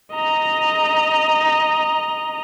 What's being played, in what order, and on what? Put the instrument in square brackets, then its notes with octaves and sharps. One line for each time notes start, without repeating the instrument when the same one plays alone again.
[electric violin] D#5 A#5